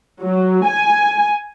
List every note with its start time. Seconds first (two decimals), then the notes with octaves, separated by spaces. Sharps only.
0.22 F#3
0.65 G#5